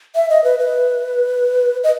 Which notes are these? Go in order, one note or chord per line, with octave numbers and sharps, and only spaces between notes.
E5
D#5
B4
B4
D#5